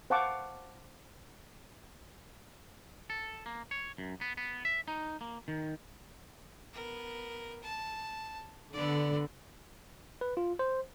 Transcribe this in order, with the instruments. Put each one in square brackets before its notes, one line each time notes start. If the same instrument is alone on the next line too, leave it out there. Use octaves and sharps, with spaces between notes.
[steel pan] C5 F5 F#5 A5 C#6 D6
[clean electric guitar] A4
A#3
C#5
F#2
B3
B3
E5
D#4
A#3
D#3
[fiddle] B3 A#4
A5
[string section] D3 [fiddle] B3 D5
[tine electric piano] B4
F4
C5